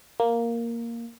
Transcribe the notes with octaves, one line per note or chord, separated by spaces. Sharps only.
A#3